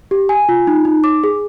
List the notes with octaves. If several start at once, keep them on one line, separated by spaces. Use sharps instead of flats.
G4
G#5
F4
D#4
D#4
D6
G#4